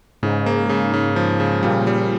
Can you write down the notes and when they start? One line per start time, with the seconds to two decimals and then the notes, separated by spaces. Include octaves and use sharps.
0.23 G#2 C#3
0.46 A#3
0.69 C#3
0.94 C#3
1.16 F3
1.40 C#3
1.63 A#2 G3
1.87 G3